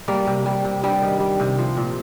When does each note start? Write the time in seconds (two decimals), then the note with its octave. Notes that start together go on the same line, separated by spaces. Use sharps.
0.08 G3 A#3
0.27 C3
0.46 G3
0.65 C3
0.83 G2 G3
1.02 D#3
1.20 G3
1.40 C3
1.58 F3
1.77 A#2